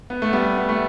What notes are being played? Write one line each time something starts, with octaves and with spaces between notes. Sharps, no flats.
B3
A3
G3 B3
B3
A3